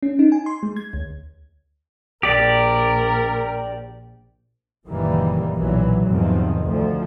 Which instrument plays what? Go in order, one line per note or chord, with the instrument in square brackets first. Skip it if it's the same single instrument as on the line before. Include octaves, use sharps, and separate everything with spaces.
[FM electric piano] C#4
D#4
G#5
C6
G#3
G#6
D2
[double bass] A#1 [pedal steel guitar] G4 D5 [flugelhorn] A#4
[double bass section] F#1 A#2 D#3 E3 G3 A#3
B1 A#2 E3 F#3
E2 G#2 C3 D#3 F3 G#3
D2 F3